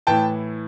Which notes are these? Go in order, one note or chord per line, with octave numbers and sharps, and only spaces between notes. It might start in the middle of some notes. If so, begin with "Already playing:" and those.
A2 E3 G5 A5